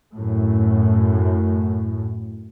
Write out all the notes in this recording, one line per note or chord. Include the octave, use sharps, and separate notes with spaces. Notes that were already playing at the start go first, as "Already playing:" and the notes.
F#2 A2